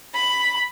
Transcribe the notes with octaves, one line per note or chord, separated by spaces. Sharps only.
B5